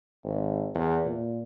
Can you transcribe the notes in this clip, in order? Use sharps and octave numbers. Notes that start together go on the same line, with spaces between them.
G#1
E2
A#2